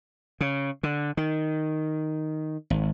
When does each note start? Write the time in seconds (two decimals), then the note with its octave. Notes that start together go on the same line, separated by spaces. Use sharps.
0.41 C#3
0.83 D3
1.17 D#3
2.70 G#1